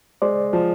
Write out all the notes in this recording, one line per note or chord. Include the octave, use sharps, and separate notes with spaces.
G#3 C5 D5
F3